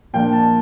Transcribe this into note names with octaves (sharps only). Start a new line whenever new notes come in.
A#2 F3 A#3 D4 G5
A5